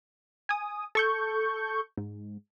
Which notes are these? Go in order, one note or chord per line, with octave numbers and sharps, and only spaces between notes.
G#5 D#6
A4 C#6 G6
G#2